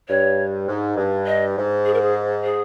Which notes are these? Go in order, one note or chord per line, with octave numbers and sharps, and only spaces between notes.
G2 C#5
G#2
G2
D#5
G#2
G#4
A#4
G#4
G#4